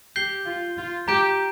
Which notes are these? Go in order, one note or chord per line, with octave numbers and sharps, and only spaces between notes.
G4 G6 C7 G7
F4
F4
G4 A#5 G6 D7